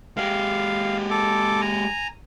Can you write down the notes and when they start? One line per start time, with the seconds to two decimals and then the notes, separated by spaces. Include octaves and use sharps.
0.17 G#3 G4 F5
1.11 A4 D6
1.61 G#5 A#5